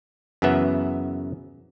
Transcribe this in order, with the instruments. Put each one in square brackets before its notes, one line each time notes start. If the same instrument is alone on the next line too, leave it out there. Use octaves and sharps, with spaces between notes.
[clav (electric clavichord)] F#2 C#3 E3 B3 E5